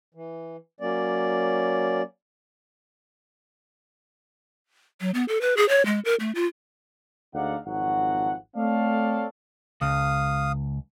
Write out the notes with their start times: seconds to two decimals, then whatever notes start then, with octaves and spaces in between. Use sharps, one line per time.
0.15 E3
0.80 F#3 A#3 C#4 D5
5.01 F#3
5.14 B3
5.28 A4
5.41 B4
5.57 G#4
5.69 C#5
5.86 G#3
6.05 A#4
6.20 A3
6.35 F4
7.34 D2 G#3 D#4 D5 F5 F#5
7.66 G#1 F2 F#3 F#4 F#5
8.56 A3 C4 A4 C#5 D5 F5
9.81 C#2 F5 D#6